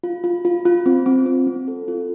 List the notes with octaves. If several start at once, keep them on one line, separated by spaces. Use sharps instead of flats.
F4
F4
F4
F4
C4
C4
C4
C4
A4
F4